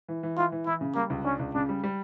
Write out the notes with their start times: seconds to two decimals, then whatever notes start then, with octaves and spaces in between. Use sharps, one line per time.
0.08 E3
0.23 E3
0.37 E3 F4
0.52 E3
0.66 E3 E4
0.81 C#3
0.95 G3 A#3
1.10 C#2
1.25 C#4 D4
1.39 C#2
1.54 C#3 D4
1.69 G3
1.84 G3